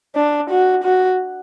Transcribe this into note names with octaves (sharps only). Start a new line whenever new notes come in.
D4
F#4
F#4